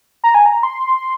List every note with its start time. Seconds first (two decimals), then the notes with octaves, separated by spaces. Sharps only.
0.24 A#5
0.35 G#5
0.46 A#5
0.63 C6